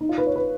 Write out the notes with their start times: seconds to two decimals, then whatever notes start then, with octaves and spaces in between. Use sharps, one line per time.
0.01 D#4
0.09 F4
0.18 B4
0.27 C#5
0.36 B4